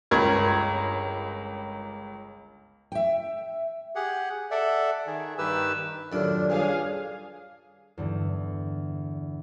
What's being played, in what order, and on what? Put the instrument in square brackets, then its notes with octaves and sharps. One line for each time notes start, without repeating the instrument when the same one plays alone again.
[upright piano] G1 C#2 A#4 G#6
[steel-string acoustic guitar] E5 G5
[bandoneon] G4 G#4 F#5
A4 D5 E5 F#5
D#3 G#4
G2 D#3 G4 B4 E6
[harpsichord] F#2 A2 D#3 [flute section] D4 F4 G4 [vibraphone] A4 D5
[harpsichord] G2 C#3 [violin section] G#4 F5
[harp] E2 G2 D3